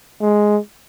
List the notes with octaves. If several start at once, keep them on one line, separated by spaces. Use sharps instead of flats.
G#3